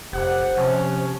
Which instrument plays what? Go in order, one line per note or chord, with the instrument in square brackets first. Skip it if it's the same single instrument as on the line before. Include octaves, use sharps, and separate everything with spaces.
[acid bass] F1 [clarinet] G4 [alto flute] C5 [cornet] F#5
[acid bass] C3 [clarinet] F3 [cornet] C#4